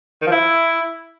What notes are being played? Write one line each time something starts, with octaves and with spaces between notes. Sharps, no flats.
D#3
F3
E4